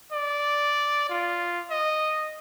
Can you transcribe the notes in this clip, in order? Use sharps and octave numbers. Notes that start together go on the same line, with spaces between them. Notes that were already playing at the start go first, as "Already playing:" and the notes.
D5
F4
D#5